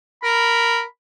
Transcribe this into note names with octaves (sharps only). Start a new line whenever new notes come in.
A#4 B5